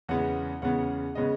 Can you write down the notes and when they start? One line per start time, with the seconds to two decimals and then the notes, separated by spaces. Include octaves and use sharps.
0.09 E2 C#3 G#3 B3 F#5
0.62 E2 C#3 G#3 B3 F#5
1.15 C#3 G#3 B3 D#5